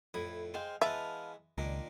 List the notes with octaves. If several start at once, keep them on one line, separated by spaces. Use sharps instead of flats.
F2 A2 E4 D#6
G#3 C5 F5 G5
E3 G#3 B3 B4 E5 F5 A5
C#2 A#2 D#3 D4 A#5